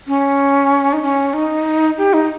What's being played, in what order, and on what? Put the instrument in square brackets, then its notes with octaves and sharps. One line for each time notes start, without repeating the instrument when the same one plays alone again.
[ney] C#4
D#4
C#4
D#4
G4
D#4